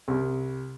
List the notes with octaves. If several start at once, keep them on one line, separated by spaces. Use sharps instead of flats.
C2